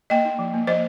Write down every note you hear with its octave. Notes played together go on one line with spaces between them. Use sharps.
A#3 D#5 G5
D#4
F3
A#3
F3 C5 D#5